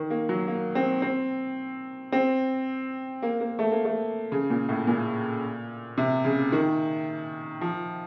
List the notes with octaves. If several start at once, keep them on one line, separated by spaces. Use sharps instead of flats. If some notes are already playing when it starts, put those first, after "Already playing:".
Already playing: D#3
A#3
F#3
A#3
C4
C4
C4
A#3
A#3
A3
A#3
A3
C#3
A#2
A2
A#2
C3
C#3
D#3
F3